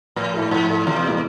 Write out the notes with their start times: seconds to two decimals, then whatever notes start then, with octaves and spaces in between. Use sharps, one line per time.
0.16 A2 F3
0.33 A3 E4 A4
0.51 G#2 F3
0.70 A3 E4 A4
0.87 E2 C3
1.05 G#3 B3 E4 G#4